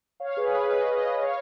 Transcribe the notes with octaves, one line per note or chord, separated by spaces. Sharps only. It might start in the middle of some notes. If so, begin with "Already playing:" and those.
C#5 F5
G#4 B4
G#4 B4
B4 D#5
B4 D#5
C#5 F5